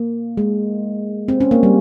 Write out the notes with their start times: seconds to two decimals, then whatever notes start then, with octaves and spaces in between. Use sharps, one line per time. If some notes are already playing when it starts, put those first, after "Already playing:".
Already playing: A#3
0.37 G#3
1.28 C4
1.40 C#4
1.51 A#3
1.63 G3